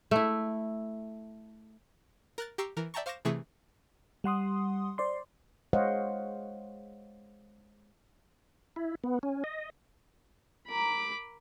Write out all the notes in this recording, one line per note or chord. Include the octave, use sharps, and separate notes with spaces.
A3 E4
A#4 F#6 A6
G4 G5 A#5 C#6 E6 C7
E3 A#4
D5 E5 G5 A5 A#5 C#6
C5 F5 C#6 D6 A#6 E7
C3 E3 A3 G#4 C#6 B6
G3 F#5 C6 D#6
C5 D5 C6
G#3 C5 C#5 D#5 F5 F#5
E4
B3
C#4
D#5
A#4 A#5 B5 D6